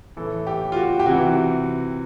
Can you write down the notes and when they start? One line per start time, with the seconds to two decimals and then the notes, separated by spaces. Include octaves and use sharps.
0.17 A2 E3 A4
0.47 G4
0.72 F4
0.76 F#4
1.00 G4
1.06 C3 E3 F#4